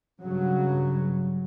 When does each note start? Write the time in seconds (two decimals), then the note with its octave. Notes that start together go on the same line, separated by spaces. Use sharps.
0.22 G2 C#3 F#3